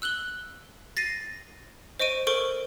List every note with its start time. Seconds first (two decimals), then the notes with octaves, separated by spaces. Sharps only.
0.02 E6 F#6 F#7 G7
0.97 A6 A#6 C7 D#7
2.00 C5 D#5 C#6 D7 D#7
2.27 A4 A#4 C5 C#6 D7 G7